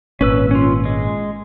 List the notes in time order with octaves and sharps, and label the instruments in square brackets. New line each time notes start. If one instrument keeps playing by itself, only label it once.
[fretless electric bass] G#1 A#2 [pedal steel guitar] C#4 B4 E6
[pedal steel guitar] C#4 F4
G#3